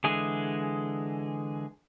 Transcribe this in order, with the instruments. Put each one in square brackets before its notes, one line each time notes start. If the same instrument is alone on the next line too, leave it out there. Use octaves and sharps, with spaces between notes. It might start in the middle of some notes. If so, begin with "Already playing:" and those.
[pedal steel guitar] D3 E3 G#3 G#4